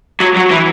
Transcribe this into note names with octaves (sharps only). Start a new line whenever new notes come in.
F#3
F#3
E3